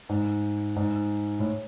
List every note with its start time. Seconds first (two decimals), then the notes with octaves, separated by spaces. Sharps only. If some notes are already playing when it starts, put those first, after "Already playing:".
0.09 G#2
0.76 G#2
1.39 A2